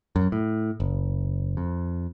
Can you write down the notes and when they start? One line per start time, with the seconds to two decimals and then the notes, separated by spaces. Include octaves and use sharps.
0.16 F#2
0.32 A2
0.80 F#1
1.57 F2